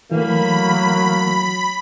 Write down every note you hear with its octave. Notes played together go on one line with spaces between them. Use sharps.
E3 F#3 A3 A#3 B5